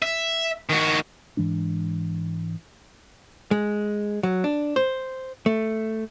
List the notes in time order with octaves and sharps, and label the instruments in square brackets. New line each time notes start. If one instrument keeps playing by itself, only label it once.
[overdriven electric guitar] E5
D#3 F#4
[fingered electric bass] G#2 E3 G#3 D4
[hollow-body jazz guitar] G#3
F#3
D4
C5
A3